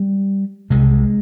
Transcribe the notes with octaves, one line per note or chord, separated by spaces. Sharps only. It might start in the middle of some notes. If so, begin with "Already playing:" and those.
Already playing: G3
C2 C3 G#3